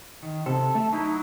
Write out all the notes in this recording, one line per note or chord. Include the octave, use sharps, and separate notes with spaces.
D#3
C3 A4
A3
F#3 D#4 E4